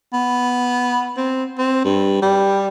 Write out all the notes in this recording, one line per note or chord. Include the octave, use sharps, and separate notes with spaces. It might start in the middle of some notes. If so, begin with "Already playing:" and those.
B3
C4
C4
G2
G3